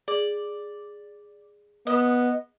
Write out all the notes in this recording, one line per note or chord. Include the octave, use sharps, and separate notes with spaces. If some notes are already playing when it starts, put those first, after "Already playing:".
G#4 D5
B3 D#5